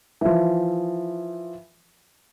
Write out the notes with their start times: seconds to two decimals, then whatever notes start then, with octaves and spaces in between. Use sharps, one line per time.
0.21 E3 F3